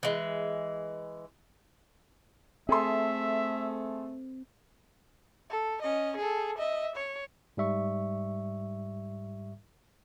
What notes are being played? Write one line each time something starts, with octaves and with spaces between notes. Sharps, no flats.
E3 G#3
A3 C4 G#4 A4 E5 C6
A4
C#4 D#5
G#4 A4
D#5 E5
C#5
G#2 G3 E5 C#6